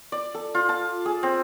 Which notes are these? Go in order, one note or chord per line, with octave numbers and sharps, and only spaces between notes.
D5
A4
F4
A5
G#4
C4